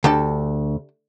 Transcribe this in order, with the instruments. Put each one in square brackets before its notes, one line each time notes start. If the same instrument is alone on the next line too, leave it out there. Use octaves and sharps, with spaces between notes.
[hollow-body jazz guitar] D2 [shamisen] D4 G4 A4